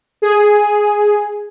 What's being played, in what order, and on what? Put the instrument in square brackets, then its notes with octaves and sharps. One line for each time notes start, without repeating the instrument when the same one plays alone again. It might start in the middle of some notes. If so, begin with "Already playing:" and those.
[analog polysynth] G#4